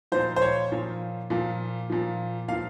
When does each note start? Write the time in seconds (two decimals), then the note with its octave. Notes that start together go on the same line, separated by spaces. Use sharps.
0.12 A#2 F3 C5
0.36 C5
0.42 C#5
0.72 A#2 F3
1.30 A#2 F3
1.90 A#2 F3
2.48 A#2 F5
2.52 F3